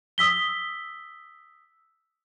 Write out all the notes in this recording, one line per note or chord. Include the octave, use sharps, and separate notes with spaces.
D#6 E6 B6 G7